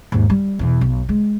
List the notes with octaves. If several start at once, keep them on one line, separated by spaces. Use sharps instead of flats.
D#2 G#2
G3
E2 B2
B1
G#3